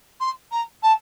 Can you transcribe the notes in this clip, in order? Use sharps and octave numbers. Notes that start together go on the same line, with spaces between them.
C6
A#5
A5